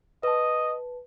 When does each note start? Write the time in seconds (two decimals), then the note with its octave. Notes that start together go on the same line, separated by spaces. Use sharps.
0.23 B4 D#5 A5